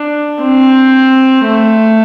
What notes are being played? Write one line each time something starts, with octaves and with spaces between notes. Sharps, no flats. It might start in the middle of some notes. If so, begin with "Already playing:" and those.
Already playing: D4
C4
A3